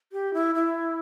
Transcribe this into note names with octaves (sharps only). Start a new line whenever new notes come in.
G4
E4
E4